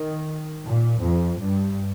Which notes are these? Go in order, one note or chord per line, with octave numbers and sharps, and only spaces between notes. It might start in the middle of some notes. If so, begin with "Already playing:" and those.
Already playing: D#3
A#2
F2
G2